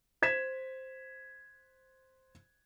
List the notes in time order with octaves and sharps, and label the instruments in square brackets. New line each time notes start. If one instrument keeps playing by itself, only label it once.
[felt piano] C5 G#6 B6 E7